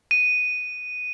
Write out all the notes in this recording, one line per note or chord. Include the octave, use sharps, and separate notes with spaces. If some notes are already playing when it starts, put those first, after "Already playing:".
D#7